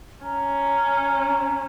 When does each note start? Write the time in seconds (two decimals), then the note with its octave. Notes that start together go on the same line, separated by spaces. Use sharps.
0.24 C#4 A#5